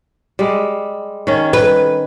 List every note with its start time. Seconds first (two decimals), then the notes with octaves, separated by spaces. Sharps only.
0.39 G3 G#3
1.27 D#3 C#4
1.53 B4